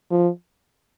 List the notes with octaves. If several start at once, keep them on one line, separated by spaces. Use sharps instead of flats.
F3